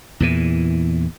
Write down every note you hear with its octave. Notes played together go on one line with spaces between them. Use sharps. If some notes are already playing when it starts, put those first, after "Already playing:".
E2 A#2 E3